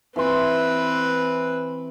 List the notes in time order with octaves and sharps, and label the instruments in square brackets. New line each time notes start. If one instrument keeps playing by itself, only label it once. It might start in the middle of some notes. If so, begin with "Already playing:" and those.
[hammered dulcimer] E3 C6 [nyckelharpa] C4 B4